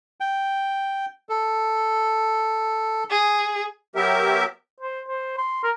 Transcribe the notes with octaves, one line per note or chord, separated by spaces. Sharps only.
G5
A4
G#4
F#3 B3 G4 A#4 E5
C5
C5
C6
A#4